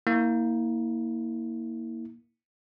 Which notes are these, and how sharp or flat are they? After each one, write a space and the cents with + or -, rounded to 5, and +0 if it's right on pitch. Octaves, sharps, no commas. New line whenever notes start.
A#3 +0 E4 -30